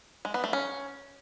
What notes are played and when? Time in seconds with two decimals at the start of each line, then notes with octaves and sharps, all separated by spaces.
0.25 G#3
0.34 B3
0.44 A3
0.53 C#4